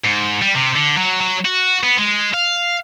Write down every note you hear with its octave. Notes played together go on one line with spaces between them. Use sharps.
G#2
G3
C3
D3
F#3
F#3
F#4
B3
G#3
F5